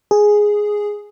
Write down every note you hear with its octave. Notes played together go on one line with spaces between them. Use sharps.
G#4